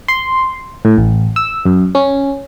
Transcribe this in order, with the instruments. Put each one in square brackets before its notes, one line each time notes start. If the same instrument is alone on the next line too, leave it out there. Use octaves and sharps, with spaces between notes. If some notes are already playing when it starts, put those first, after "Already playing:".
[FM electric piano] C6
A2
A1
E6
F#2
C#4